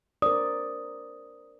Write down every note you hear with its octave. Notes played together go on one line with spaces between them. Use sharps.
A#4 C5 D5 D#6